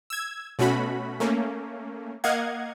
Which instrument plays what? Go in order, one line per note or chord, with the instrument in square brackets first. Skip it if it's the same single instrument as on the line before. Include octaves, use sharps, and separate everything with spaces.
[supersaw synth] E6 G#6
B2 A3 C#4 F#4 B5
A3 A#3 C#4
A#3 D#5 F5 F#5 G#6